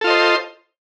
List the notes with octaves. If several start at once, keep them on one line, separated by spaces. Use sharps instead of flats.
F4 A4 C5 D#5